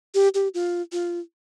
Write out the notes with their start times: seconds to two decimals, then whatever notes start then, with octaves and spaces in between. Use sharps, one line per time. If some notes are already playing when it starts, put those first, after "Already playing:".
0.15 G4
0.34 G4
0.54 F4
0.92 F4